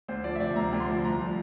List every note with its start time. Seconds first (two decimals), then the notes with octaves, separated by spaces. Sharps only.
0.08 D2 C5
0.24 F3 D5
0.35 E5
0.40 C3 D5
0.56 D2 A#5
0.73 D2
0.80 C6
0.88 F3
1.04 C2 A#5
1.20 F3